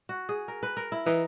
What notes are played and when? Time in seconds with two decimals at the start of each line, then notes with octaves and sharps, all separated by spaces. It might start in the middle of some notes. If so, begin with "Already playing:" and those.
0.09 F#4
0.29 G#4
0.48 A#4
0.63 B4
0.77 A#4
0.92 E4
1.06 E3 D#4